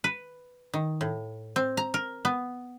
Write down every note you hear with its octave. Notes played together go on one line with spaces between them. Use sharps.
B4
D#3
A2
C4
A#5
A#4
B3